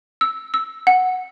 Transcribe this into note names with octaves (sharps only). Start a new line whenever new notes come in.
E6
E6
F#5